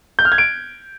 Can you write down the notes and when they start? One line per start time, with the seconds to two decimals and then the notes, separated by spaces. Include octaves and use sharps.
0.19 G6
0.25 F6
0.32 G#6
0.38 D7